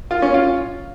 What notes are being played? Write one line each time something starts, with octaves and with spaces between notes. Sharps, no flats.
F4
C#4
F4